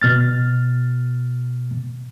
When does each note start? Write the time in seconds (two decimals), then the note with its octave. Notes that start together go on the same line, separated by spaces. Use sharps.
0.02 B2 F6 A6